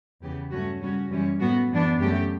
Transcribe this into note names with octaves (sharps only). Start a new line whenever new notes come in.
E2 C#3 E3 B3 G4
G2 F#3 A3 C#4 F#4
C#3 G3 C#4 F#4
F#2 E3 G3 C#4
A2 F#3 B3 F#4
F#2 E3 B3 D4
F#2 C#3 F#3 A3 G4